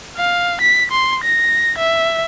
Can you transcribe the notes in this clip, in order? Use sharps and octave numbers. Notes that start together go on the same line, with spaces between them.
F5
B6
C6
A#6
E5